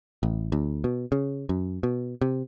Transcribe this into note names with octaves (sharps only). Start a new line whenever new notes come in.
A1
D2
B2
C#3
F#2
B2
C3